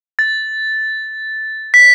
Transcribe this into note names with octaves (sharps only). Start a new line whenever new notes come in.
A6
B6